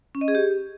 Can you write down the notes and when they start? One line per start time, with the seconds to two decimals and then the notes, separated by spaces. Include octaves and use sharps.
0.15 C#4
0.21 D#5
0.28 G#4
0.35 G4